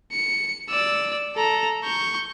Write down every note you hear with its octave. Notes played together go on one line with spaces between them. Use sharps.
C#7
D5 E6
A4 A#5
C#6 G6